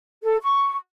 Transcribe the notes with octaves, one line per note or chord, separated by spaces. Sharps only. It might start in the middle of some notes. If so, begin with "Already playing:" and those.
A4
C#6